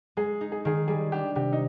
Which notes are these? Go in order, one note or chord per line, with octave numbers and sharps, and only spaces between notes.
G#3 G#4
D#4
G#4
D#3 G#4
G3 G#4
D4 G4
C3 G4
D#4